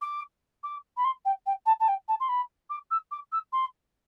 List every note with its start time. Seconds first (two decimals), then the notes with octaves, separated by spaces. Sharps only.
0.01 D6
0.63 D6
0.97 B5
1.04 C6
1.25 G5
1.46 G5
1.66 A5
1.80 A5
1.88 G5
2.08 A5
2.20 C6
2.28 B5
2.70 D6
2.91 E6
3.11 D6
3.32 E6
3.52 C6